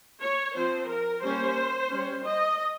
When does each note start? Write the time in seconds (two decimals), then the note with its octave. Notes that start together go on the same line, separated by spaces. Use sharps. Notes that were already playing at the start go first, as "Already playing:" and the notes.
0.21 C#5
0.55 F3 C4 C5
0.89 A#4
1.22 G3 A#3 C#4 C5
1.89 G3 C#4
2.23 D#5